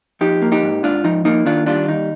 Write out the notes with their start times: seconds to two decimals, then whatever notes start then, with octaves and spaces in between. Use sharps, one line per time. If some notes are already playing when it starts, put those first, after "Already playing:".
0.21 F3 D#4 G4
0.42 A#3
0.52 D#4 G4
0.62 G#2
0.83 G#2 D4 F4
1.04 F3 D#4
1.25 A#3 D#4
1.46 D#3 D4 F4
1.66 G3 D4 F4
1.88 D#2 D#4